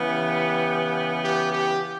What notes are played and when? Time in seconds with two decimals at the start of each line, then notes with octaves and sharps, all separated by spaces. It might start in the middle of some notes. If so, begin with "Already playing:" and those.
Already playing: C#3 E3 B3
0.09 G4
1.24 G4
1.53 G4